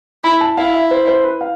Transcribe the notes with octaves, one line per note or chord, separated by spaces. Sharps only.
E4 B5
A5
E4 F5
E5
C5
C5
B4
F5